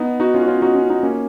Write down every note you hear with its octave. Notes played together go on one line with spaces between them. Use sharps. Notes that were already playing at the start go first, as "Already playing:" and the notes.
Already playing: B3 D#4
D#4 F#4
C#4 F4
F#4
C#4 F4
D#4 F#4
C#4 F4
B3 D#4
A#3 C#4